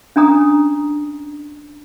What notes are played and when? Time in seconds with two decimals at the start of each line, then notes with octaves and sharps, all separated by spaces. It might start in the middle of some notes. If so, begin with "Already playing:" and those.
0.16 C#4 D4 A#5 D#6